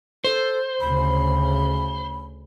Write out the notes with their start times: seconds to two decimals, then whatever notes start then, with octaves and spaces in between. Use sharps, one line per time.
0.24 A4 C5
0.81 D2 C#3 B5